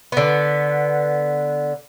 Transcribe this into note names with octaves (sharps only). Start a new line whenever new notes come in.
D3 B3